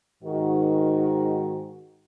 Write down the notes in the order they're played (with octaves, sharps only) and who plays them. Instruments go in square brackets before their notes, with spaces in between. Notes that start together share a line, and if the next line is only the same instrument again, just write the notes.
[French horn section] G#2 D#3 F#4